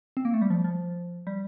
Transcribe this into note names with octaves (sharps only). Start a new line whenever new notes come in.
C4
A#3
A3
G3
F3
F3
G3